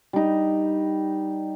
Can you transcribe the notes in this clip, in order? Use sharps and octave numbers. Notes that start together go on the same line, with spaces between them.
G3 D#4